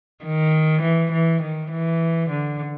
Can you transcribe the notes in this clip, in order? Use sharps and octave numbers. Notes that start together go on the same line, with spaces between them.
D#3
E3
E3
D#3
E3
D3